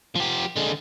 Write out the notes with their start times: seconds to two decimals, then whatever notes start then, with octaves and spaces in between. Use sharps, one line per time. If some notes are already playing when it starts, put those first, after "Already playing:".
0.15 F3 G4
0.57 D3 G#3